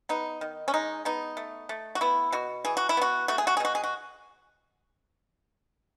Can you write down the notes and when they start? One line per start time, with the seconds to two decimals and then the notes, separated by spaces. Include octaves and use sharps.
0.09 B3 D#4
0.41 D#3
0.68 C#4
0.74 G#3 D#4
1.05 B3 D#4
1.37 A3
1.69 A3
1.95 F#4
2.01 B3 E4
2.32 B2 F#4
2.65 E3 G#4
2.77 F#4
2.89 E4
2.97 B3 F#4
3.28 A3 F#4
3.38 G#4
3.47 F#4
3.57 G#4
3.60 B2 F#4
3.75 G#4
3.84 F#4